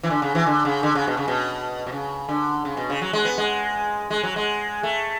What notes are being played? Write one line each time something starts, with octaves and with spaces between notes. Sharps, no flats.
E3
D3
C#3
E3
D3
C#3
D3
C#3
B2
C#3
B2
B2
C#3
D3
C#3
B2
C#3
F#3
G#3
B3
G#3
G#3
F#3
G#3
A3